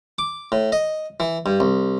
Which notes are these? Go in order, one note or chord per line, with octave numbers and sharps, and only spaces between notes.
D6
A2
D#5
E3
G2
C2